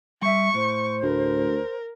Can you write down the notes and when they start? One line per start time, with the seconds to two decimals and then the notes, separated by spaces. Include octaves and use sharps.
0.22 G3 E5 C#6
0.54 A2 C5
1.03 D2 A#4